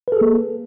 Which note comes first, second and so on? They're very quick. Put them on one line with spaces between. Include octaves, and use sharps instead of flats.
B4 A4 G#4 A#3